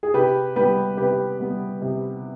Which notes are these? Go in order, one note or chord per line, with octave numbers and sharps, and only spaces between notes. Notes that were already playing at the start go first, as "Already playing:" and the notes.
G#4
C3 G4 B4
G3 B3 G4 B4
C3 G4 B4
G3 B3
C3